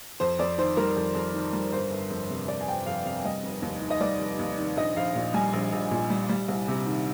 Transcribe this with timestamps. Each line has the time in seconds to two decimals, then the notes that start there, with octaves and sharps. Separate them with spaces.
0.20 F2 C5
0.39 F2 D5
0.58 D#3 C5
0.77 G3 A#4
0.96 F2
1.15 F2
1.34 D#3
1.53 G3
1.72 G1 C5
1.91 G1
2.11 F2
2.30 C3
2.48 G1 D5
2.61 G#5
2.68 G1 G5
2.86 F2 F5
3.05 C3 F5
3.24 G3 D#5
3.43 F1
3.62 D#2
3.82 D#3
3.90 D#5
4.00 G3 D5
4.20 F1
4.39 D#2
4.58 D#3
4.77 A#1 D#5
4.96 A#1 F5
5.15 A#2
5.34 G3 G#5
5.53 A#1
5.72 A#1
5.91 A#2
6.10 G3
6.29 G3
6.48 C2
6.68 C3
6.86 D#3